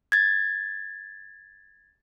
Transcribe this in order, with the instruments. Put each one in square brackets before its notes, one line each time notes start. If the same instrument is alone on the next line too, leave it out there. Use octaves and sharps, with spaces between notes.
[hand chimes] G#6 A6